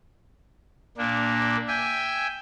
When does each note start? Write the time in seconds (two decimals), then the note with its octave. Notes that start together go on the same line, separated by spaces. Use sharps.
0.97 A#2 A#3 D4
1.68 E5 G5 G#5